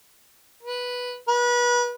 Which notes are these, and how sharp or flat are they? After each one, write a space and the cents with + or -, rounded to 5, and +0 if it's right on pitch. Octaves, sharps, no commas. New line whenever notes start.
B4 -5
B4 -30